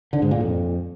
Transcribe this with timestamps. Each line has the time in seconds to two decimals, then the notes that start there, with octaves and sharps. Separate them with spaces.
0.13 D3
0.22 G#2
0.31 A#2
0.40 F2